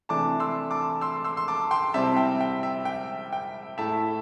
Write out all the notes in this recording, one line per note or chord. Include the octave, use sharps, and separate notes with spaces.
C3 E3 A3 D4 A5 D6
C6 E6
A5 D6
C6 E6
C6 E6
C6
A5 D6
G5 C6
C3 G3 C4 E4 E5 A5
G5
G5
E5
G5
G5
A2 A3 E4 E5 A5